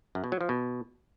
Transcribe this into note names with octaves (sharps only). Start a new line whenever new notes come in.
F#2
B2
F#3
F3
B2